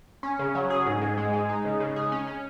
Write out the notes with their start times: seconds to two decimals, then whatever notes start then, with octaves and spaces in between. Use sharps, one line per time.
0.23 C#4
0.39 C#3
0.55 F#3
0.70 G#4
0.86 G#2
1.01 G#2
1.17 G#3
1.33 G#3
1.49 D#4
1.65 C#3
1.80 C#3
1.96 G#4
2.12 C#4
2.27 C#4